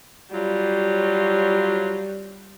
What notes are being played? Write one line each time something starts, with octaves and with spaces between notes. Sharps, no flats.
F#3 G3 C#4 F4